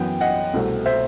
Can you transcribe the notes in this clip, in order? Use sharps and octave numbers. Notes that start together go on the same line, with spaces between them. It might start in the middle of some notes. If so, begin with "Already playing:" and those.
Already playing: F#2 E3 B3 G5
D#5 F#5
C2 B2 A3 C4
C5 E5